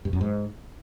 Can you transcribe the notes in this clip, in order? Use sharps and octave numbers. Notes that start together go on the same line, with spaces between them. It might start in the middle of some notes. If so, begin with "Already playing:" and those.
G2
F#2
G#2